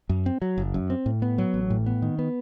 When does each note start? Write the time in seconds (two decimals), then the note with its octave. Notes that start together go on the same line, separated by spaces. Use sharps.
0.09 F#2
0.26 C4
0.42 F#3
0.58 F#1
0.74 F#2
0.90 C4
1.06 A2
1.22 B3
1.38 F#3
1.54 A1
1.70 A2
1.86 B3
2.02 D#3
2.19 B3